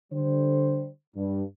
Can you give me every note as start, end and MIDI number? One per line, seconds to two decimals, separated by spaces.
0.13 0.89 50
0.13 0.89 55
0.13 0.89 72
1.16 1.43 43